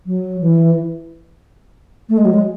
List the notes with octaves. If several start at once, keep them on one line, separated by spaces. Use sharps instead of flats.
F#3
E3
A3
G#3
F#3
G#3